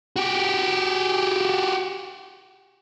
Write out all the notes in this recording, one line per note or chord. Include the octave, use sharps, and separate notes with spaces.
F#4 G4